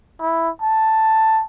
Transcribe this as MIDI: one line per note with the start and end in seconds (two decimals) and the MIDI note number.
0.21 0.50 64
0.62 1.43 81